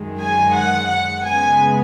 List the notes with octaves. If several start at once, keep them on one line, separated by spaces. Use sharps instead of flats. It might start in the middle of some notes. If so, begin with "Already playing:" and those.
Already playing: F#2 D#3 G#3
G#5
F#5
F#5
C#3 G#3 B3 G#5